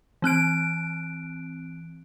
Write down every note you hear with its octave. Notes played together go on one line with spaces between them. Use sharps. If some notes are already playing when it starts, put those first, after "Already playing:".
E3 C4 F#6 D7